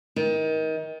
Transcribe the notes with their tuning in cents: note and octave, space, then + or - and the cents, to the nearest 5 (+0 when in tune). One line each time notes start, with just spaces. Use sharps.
D#3 +25